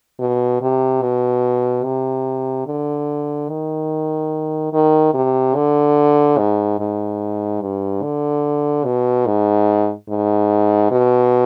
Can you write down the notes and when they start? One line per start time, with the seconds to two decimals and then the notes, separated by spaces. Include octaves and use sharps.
0.19 B2
0.62 C3
1.02 B2
1.84 C3
2.67 D3
3.49 D#3
4.73 D#3
5.14 C3
5.55 D3
6.38 G#2
6.79 G#2
7.61 G2
8.02 D3
8.85 B2
9.26 G#2
10.09 G#2
10.91 B2